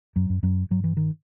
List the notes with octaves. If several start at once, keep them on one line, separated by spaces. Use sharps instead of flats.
F#2 F#3
F#2
F#2 F#3
G2 F#3
E3
D#3